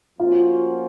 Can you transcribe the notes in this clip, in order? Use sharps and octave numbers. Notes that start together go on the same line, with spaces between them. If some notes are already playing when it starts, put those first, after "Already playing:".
F3 A#3 C#4 F4 F#4 C5